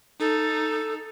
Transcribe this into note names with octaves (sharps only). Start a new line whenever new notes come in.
D#4 A4